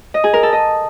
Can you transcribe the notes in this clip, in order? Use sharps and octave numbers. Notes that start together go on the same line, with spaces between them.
D#5
G#4
A#4
A4
D#5